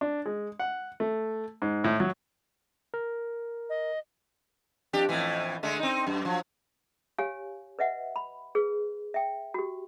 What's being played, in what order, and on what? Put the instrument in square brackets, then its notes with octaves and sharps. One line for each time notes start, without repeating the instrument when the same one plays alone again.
[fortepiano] D4
G#3
F#5
A3
G#2
A2
F#3
[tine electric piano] A#4
[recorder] D#5
[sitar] F2 D4 G4
F2 A2 E3
D3 G#3 A3
C4 D#4
F#2
F3 F#3
[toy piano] G4 C#5 F5 G#5
B4 D#5 E5 F#5
B5
G#4 B4
E5 G5
F#4 G4